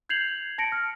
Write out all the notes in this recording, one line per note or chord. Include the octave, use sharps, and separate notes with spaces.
G6 G#6 C7 F7 F#7
A5 A#6 C#7 D7
F6